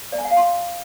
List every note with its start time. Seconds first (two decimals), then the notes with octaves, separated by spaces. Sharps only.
0.12 D5
0.18 G#5
0.25 F#5
0.31 F5
0.37 C6